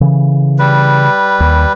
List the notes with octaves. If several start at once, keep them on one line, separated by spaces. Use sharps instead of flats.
C#3 E3
G3 B4
D#2